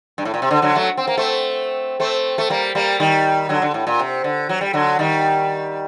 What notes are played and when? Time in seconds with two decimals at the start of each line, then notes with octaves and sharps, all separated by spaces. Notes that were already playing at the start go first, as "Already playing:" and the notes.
0.18 G2
0.25 A2
0.34 A#2
0.42 C3
0.51 D3
0.62 D3 F#3
0.75 F#3 A3
0.97 C4
1.07 A#3
1.17 A3 C4
2.00 A3 C4
2.38 A3
2.50 G3 A#3
2.75 G3 A#3
3.00 D#3 G3
3.49 D3 F#3
3.62 D3
3.74 A2
3.87 A#2
3.99 C3
4.24 D3
4.49 F#3
4.61 G3
4.73 D3 F#3
4.99 D#3 G3